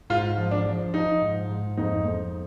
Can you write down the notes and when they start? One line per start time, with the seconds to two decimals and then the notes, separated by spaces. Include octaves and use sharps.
0.10 G#2 F4
0.37 F3
0.51 D4
0.66 F3
0.94 F3 D#4
1.21 G#2
1.49 G#2
1.77 F2 D#4
2.05 F2